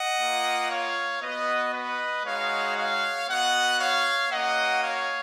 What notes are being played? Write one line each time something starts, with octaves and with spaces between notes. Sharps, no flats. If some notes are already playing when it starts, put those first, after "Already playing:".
Already playing: D#5 F#5
A#3 F4
C#5 F5
B3 F#4 B4 D#5
B4 D#5
G#3 D#4 F#4 C#5 F5
C#5 F5
B3 F#4 D#5 F#5
C#5 F5
A#3 C#4 F#4 D#5 F#5
C#5 F5